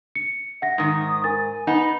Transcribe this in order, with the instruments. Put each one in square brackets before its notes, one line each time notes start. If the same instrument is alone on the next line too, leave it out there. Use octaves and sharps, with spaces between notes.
[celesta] C#7
[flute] E5 [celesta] F#5 A#6
[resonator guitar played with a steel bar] G#2 D#3 [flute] D#6
[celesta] A#4 A6 [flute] G#5
[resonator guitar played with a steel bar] B3 D#4 [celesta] F#5 [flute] B5